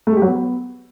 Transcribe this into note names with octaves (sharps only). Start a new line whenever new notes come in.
A3
G#3
G4
F#3
B3